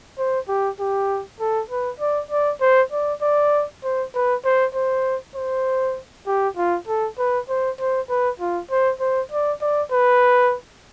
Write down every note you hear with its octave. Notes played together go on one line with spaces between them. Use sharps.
C5
G4
G4
A4
B4
D5
D5
C5
D5
D5
C5
B4
C5
C5
C5
G4
F4
A4
B4
C5
C5
B4
F4
C5
C5
D5
D5
B4